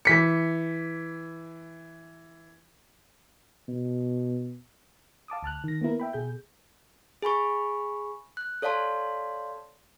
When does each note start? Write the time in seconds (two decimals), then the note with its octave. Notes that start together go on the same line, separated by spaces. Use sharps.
0.05 E3 B6 C#7
3.68 B2
5.28 F5 A5 D6 D#6
5.43 D2 A5 F6 F#6
5.64 D#3 A#6
5.81 A#3 B3 E4 A#4
6.00 E5 G5 B5
6.13 B2 G#4 G6
7.22 G#4 G#5 B5 C#6
8.37 F#6
8.62 A4 C#5 D5 F5 A5 C6